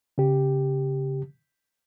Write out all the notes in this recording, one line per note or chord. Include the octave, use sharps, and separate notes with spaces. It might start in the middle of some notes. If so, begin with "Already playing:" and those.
C#3 G4